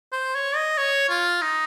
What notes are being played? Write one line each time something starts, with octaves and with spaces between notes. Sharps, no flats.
C5
C#5
D#5
C#5
F4
D#4